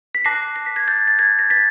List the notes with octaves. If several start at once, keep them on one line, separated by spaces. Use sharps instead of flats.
B6
A5 D6 F#6 A#6 C7
A#6
B6
G#6 A#6
G6 A6
A6
G#6 A#6
A#6
A6 B6